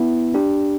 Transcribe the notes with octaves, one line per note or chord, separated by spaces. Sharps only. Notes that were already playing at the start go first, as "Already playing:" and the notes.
Already playing: B3 E4
D4 G4